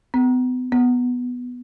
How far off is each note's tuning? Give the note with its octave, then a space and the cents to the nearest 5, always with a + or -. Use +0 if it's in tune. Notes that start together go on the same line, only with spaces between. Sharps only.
B3 +35
B3 +0